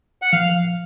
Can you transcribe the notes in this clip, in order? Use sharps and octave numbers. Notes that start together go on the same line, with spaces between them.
F#5
F3 F5